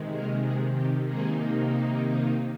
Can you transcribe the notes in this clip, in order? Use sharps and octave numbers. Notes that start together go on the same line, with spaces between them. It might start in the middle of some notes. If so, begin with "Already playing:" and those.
Already playing: C3 D#3 G#3
A#3 A#4
G#3 G#4
G4
C3 D#3 G#3 A#3 D#4 G#4